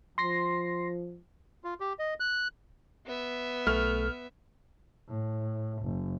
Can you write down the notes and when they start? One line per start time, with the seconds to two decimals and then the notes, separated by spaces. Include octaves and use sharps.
0.18 F3 C6 A#6 C7
1.64 F4
1.80 G4
1.99 D#5
2.20 F#6
3.05 B3 E5
3.67 B1 A3 F6
5.09 A2
5.84 F#1